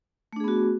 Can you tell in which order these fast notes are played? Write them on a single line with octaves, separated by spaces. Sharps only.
A3 D4 G#4 B3 F#4